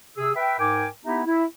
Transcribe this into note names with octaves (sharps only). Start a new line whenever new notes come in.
C3 G#4 E6
B4 E5 G5
G#2 A#4 G5 G#5 D6
B3 D#4 E4 G4 E5 A#5
E4